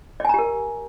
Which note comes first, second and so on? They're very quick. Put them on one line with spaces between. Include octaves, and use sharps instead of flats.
D5 G#5 A#5 G4 A#4